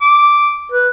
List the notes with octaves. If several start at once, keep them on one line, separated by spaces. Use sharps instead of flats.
D6
B4